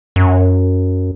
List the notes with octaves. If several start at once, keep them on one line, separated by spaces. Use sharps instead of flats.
F#2